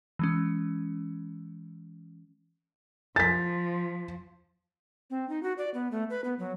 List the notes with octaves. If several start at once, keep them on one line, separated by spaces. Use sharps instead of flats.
E3 G#3 C#4
F3 A6 B6
C4
D#4
F#4
D5
B3
A3
B4
B3
F#3